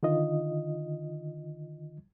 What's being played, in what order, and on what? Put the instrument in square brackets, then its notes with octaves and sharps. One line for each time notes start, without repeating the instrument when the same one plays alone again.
[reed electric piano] D3 D#3 F4 D#5